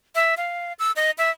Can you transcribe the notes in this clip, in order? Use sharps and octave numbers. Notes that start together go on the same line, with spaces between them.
E5
F5
E6
D#5
E5